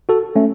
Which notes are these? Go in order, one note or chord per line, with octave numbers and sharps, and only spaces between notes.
F#4 A4
A3 C#4